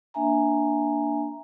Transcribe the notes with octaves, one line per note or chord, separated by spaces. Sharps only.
A#3 D4 E5 G#5 A#5